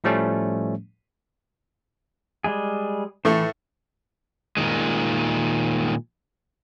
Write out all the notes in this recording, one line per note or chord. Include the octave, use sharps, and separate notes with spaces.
A2 F3 G3 A3 C#4
G3 G#3 G#4
A2 E3 A3
A#2 D#3 G#3